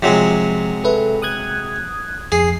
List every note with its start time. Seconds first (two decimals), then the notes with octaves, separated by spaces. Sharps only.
0.03 C3 F3 F#3 G#3
0.84 A4 B4 E5
1.22 D#6 F#6 G#6
2.32 F2 G#4 C7